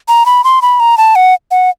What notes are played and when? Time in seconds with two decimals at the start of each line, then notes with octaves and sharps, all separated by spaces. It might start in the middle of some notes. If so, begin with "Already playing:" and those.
0.08 A#5
0.26 B5
0.44 C6
0.62 B5
0.80 A#5
0.98 A5
1.16 F#5
1.51 F#5